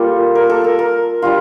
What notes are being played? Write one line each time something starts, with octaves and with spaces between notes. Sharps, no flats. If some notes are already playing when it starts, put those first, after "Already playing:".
Already playing: G3 A#3 F4 A4
A#4
A4
A#4
A#4
G3 D4 F4